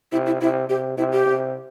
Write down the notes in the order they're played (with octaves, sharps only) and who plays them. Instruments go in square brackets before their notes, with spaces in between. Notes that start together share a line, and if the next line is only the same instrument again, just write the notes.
[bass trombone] C3 [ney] E4
[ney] E4
[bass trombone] C3 [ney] E4
[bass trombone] C3 [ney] G4
[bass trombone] C3 [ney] E4
[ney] G4
[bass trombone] C3